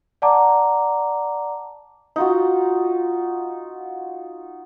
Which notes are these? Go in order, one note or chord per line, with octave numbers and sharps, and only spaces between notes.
D5 F#5 A5 A#5 D6
D#4 F4 F#4